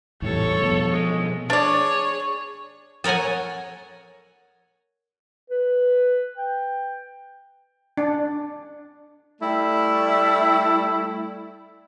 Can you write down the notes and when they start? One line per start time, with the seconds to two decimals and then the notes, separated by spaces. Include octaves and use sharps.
0.22 E2 A2 G3 A4 C#5
0.62 B2 F3
0.92 G#3
1.50 D4 G#4 C#5 D5
3.04 A4 A#4 C#5 F#5 G#5
5.50 B4
6.37 G5
7.97 D4
9.40 G3 A3 E4